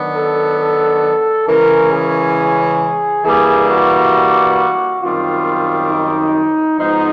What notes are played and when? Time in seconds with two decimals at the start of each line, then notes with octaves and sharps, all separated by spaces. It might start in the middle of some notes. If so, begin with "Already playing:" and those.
Already playing: D#3 F#3 B3 D4
0.16 A4
0.60 A4
1.48 C#3 E3 G#3 C#4 A#4
1.92 G#4
3.25 G2 E3 G3 A#3 G#4
3.70 F#4
5.01 F#2 D#3 G3 C4 F4
5.91 D#4
6.79 G#2 F3 G#3 B3 D#4